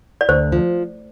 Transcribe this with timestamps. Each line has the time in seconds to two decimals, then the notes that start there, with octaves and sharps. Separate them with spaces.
0.21 D5
0.29 D2 C5
0.52 F3